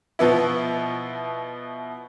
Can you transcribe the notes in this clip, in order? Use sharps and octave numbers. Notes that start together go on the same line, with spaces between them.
B2 F3 B3 E4